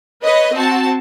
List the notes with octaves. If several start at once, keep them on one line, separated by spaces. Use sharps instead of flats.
B4 C#5 D#5
C4 F#4 A5